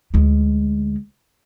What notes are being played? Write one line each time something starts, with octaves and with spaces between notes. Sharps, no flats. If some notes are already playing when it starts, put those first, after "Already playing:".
D2 G#3